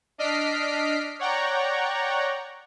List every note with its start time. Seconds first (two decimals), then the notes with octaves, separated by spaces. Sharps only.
0.18 D4 D#5 F6 B6 C7 D7
1.19 C#5 D5 F#5 G5 A#5 C#6